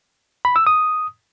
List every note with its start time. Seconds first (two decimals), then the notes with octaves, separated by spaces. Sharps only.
0.45 B5
0.56 E6
0.67 D#6